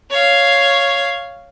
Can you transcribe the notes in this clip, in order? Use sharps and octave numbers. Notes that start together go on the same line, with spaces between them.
C#5 F5